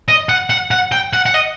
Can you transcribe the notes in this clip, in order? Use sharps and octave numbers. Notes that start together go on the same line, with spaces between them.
D#5
F#5
F#5
F#5
G5
F#5
F#5
D#5